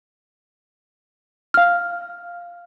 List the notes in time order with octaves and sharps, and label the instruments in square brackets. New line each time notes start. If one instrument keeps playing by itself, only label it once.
[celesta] F5 F6